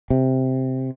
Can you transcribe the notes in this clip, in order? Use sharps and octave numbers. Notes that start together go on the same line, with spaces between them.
C3